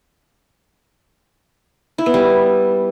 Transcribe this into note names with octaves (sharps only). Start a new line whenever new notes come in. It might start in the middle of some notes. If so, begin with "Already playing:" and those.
E4
B3
G3